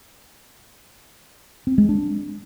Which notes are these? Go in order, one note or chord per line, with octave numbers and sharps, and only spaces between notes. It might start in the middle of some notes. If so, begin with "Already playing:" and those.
C4
G#3
D4